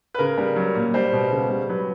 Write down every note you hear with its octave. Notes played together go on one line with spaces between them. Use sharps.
B4
C#3 A#4
G3
F#3
A#2
G3 C5
B2
C#3
G3
F#3 B4